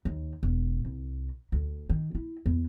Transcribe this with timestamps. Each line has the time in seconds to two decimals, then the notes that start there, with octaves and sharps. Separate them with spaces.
0.05 D#2
0.43 E1
0.85 C2
1.52 D2
1.90 D#3
2.15 E4
2.46 E2